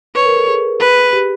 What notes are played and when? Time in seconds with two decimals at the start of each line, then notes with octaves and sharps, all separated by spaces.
0.15 B4 C#5
0.25 A#4
0.36 A4
0.47 G#4
0.80 B4
1.13 G4